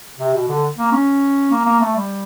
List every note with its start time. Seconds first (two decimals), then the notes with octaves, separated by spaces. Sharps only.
0.18 C3
0.34 B2
0.48 D3
0.78 A#3
0.92 C#4
1.51 A#3
1.65 A#3
1.80 A3
1.95 G3